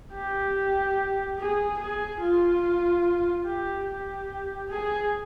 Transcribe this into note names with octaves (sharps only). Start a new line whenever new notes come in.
G4
G#4
G#4
F4
G4
G4
G#4